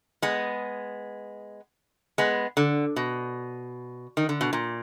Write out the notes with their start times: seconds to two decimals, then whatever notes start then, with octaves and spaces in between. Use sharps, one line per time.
0.22 G#3 B3
2.18 G#3 B3
2.57 D3
2.96 B2
4.17 D#3
4.29 D3
4.41 B2
4.53 A#2